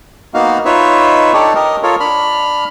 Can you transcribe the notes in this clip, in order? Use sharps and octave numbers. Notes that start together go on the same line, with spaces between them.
A#3 B3 D#4 F#4 F5
D#4 F4 B4 C#5 E5
D4 D#4 G4 A4 C#5 D5
G4 A#4 D#5
F4 A4 A#4 C#5
D4 B5 F6